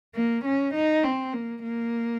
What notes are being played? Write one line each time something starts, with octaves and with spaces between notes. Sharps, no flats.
A#3
C#4
D#4
C4
A#3
A#3